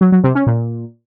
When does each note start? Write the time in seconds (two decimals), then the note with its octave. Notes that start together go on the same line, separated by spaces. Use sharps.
0.01 F#3
0.12 F#3
0.24 C3
0.35 C#4
0.47 A#2